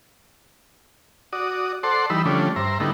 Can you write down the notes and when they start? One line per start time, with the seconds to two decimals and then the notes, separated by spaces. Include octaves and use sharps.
1.33 F#4 D5 D#6
1.83 A4 C5 D5 F#5 C6
2.10 E3 G3 D#4 B5 E6
2.26 D3 F3 G3 A3 C#4 D4
2.56 G2 C5 E5 A#5
2.80 D3 G3 A3 B3 D#4 E4